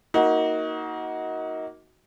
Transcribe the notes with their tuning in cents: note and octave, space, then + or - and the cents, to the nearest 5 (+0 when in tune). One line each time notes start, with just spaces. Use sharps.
A#3 +0 D#4 +25 F#4 +0